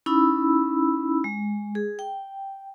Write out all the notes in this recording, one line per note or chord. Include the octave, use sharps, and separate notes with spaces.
C#4 D#4 E4 B5 E6
G#3
G#4
G5